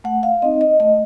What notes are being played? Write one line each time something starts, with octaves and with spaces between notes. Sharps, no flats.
A3 F#5
F5
C4 D#4 D#5
D#5
A3 D#5